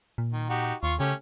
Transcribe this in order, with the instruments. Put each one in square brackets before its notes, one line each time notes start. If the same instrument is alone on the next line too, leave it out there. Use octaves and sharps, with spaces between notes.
[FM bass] A#2
[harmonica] D#3
D#4 F#4 G4
[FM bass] D#2 [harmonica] F4 C#6
[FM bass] C#3 [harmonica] A3 C#4 G4